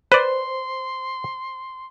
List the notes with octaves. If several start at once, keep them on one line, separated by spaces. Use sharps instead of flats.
B4 C5 D5 C6